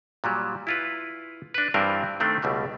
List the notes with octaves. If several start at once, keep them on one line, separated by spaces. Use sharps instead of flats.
A#2 F#3 G3
E4 F4 B4
D4 B4
G2 E3 G3 C4 D4 A#4
D#3 A3 C4 D4
C#2 B2 G3 A3